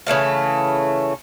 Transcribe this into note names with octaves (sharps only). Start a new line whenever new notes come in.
C#3 E3 A3 F5